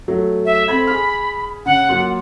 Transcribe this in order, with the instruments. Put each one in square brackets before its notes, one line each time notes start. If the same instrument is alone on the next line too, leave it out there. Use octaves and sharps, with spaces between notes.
[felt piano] F#3 A3
[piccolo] E5
[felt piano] C4 A4 G#6 [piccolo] B5
[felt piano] G#4 F6
[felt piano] C#3 [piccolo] F#5
[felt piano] F#3 A#3 F4